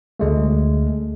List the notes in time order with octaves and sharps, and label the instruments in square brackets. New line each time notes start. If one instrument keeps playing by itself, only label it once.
[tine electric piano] D2 G#3 A3